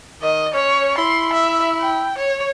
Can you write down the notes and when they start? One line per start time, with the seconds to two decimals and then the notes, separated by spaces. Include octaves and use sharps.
0.22 D#3 D#5
0.54 C#4 C#5
0.98 E4 C6
1.33 E5
1.81 G5
2.18 C#5